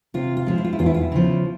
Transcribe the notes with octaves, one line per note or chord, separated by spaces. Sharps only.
C3 F4
F4
F3 G#3
E4
F4
E4
E2 F4
E4
F4
E4
C#3 F3